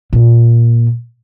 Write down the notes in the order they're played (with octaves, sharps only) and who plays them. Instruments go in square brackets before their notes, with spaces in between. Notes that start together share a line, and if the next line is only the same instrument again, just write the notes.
[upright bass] A#2